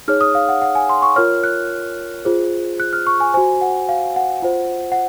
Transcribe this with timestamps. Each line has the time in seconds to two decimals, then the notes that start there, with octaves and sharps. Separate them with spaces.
0.08 D#4 G#4 C#5 F6
0.21 D#6
0.35 F5
0.49 F#5
0.62 F#5
0.75 G#5
0.89 C6
1.02 C#6
1.16 F4 A#4 C#5 F6
1.44 F#6
2.25 F4 G#4 C5
2.80 F#6
2.93 F6
3.07 C#6
3.20 G#5
3.34 F#4 C5 G#5
3.61 F#5
3.89 F5
4.16 F#5
4.42 F4 C5
4.92 F#5